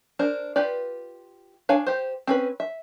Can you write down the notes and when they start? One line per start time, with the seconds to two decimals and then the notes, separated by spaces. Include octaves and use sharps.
0.19 D4 A#4 C5
0.56 F4 G4 B4 D5
1.69 D4 C#5 F5 G#5
1.86 G4 C5
2.27 C4 C#4 B4
2.60 E5